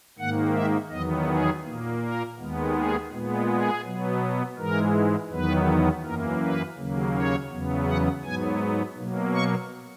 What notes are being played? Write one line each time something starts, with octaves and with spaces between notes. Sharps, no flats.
G#2 D#3 A#3 F#5
E5
E2 D#3 F#3 B3 D#5
G#4
A#2 A#3
A#4
D#2 D#3 G#3 B3
G#4
A#2 G#3 B3
G#4
B2 F#3 B3
G#2 E3 G#3 A#4
E2 D#3 F#3 B3 B4
F#2 E3 A#3 A#4
B4
D#2 C#3 F#3 A#3
C#5
E2 C#3 F#3 B3
F#5
G#2 F#3 B3 G#5
B2 F#3 A#3
C#6